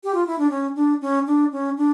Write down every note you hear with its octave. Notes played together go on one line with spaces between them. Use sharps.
G4
F4
E4
D4
C#4
D4
C#4
D4
C#4
D4